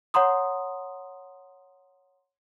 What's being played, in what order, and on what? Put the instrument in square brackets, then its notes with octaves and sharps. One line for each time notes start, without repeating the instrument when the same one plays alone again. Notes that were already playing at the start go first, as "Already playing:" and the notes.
[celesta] C#5 F#5 A#5 C6 D#6